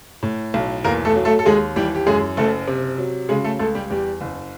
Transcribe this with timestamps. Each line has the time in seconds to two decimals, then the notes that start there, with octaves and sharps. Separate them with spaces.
0.23 A2
0.54 B1
0.84 E2 A#3 A#4
1.05 A3 A4
1.15 F#3
1.25 A3 A4
1.39 A4
1.46 D#2 G#3 G#4
1.76 E3 G3 G4
1.95 G4
2.06 F#2 G#3 G#4
2.37 F#1 A3 A4
2.67 C3
2.98 F#3
3.29 C#3 G#3 G#4
3.44 A3 A4
3.59 C#2 A3 A4
3.75 G3 G4
3.90 E2 G3 G4
4.21 F#1